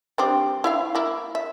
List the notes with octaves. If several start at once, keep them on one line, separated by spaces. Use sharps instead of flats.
G3 C4 D4
E4 E5 F5
A#3 E4
E5